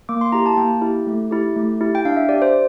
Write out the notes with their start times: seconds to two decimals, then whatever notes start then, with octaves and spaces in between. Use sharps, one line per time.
0.09 A#3 D6
0.21 C6
0.32 E4 G4 A#5
0.46 A5
0.57 A#3 G5
0.82 E4 G4
1.07 A3
1.31 E4 G4
1.56 A3
1.80 E4 G4
1.95 G5
2.05 D4 F5
2.17 E5
2.29 G4 D5
2.42 C5